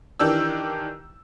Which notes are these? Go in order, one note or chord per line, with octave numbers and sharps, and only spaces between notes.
D#3 E3 D4 G4 E6